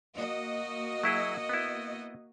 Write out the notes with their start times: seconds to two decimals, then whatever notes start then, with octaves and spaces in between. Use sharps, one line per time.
0.16 A#3 F#4 D#5
1.03 F#3 E4 G#4
1.49 B3 E4